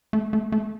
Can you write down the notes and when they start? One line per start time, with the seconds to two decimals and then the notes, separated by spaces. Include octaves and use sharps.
0.13 A3
0.33 A3
0.52 A3